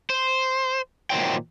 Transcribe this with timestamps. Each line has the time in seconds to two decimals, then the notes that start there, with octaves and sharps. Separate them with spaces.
0.10 C5
1.10 A#2 D#3 F#3 C5 G5